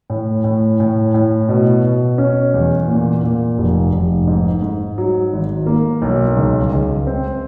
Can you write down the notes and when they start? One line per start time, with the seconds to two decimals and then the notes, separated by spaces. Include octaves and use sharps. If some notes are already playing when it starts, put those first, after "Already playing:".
0.10 A2
0.44 A2
0.80 A2
1.14 A2
1.49 B2
1.84 B2
2.18 C#4
2.54 E2
2.88 A#2
3.23 A#2
3.58 F1
3.93 F1
4.27 G#2
4.62 G#2
4.98 F#3
5.33 G#1
5.66 A#3
6.02 B1
6.37 C#2
6.72 C#2
7.07 C4